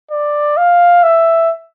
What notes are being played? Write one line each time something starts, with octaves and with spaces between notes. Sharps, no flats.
D5
F5
E5